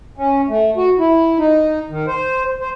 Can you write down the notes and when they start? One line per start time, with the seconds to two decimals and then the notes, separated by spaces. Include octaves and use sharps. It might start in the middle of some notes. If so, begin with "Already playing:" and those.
0.17 C#4
0.48 A3
0.77 F#4
0.99 E4
1.38 D#4
1.90 D#3
2.07 C5
2.61 C5